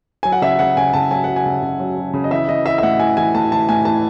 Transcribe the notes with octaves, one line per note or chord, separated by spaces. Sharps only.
F#3 G#5
F#5
C#3 E5
C#3 F#5
C#3 G#5
C#3 A5
F#3 G#5
F#3 F#5
G#5
C#3
C#3
F#3
F#3
C#3
D#5
E3 E5
E3 D#5
E3 E5
E5
A2 F#5
E3 G#5
E3 G#5
A2 A5
E3 A5
A2 G#5
E3 A5